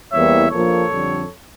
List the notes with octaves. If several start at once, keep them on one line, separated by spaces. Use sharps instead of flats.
E2 E3 G3 A#3 C#5 E5
A#1 A#2 F3 A#3 A4 C#5
F2 D3 G3